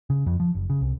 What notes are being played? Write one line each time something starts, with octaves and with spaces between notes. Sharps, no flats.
C#3
F2
F3
F#1
C#3
C2